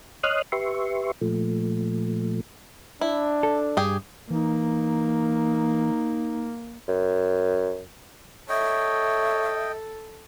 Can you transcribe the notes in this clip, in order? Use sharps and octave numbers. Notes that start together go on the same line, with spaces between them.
C#5 D#5 C6 D#6 F6 F#6
G4 B4 E5 C6 C#6
A#2 F3 A3
D4 E4
A4
G2 G4 G#4
E3 A#3 D#4
F#2
A4 C#5 D#5 E5 G5